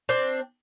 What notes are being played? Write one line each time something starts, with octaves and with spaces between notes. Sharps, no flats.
C4 D4